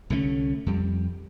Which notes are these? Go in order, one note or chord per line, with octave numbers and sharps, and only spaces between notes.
C2 D3 A3 C#4
F2 G3